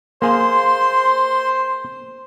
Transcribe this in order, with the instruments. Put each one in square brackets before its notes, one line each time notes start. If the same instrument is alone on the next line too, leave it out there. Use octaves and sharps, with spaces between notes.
[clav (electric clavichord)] A#3 G#4 F5 [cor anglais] C5 [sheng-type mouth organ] C6